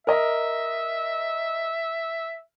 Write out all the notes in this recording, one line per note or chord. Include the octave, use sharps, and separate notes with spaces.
A#4 D#5 E5